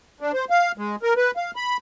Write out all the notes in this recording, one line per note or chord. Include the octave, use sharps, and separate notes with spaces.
D4
C5
F5
G#3
A#4
B4
F5
B5